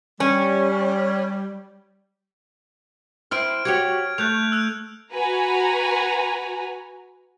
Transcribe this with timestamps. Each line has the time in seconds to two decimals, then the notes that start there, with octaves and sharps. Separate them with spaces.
0.20 G3 C#4
3.31 C4 E4 C5 F6 D7
3.65 F#4 G4 C#5 G#6
4.18 A3 F#6 G6 F7
4.52 E6 F#6 F7
5.13 F#4 B4 G#5 A#5